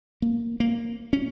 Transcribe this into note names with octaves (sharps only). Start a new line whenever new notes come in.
A#3
A#3
C#4